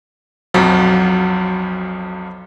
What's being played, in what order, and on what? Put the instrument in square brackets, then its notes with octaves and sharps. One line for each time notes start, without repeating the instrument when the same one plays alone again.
[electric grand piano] B1 F2 F3 F#3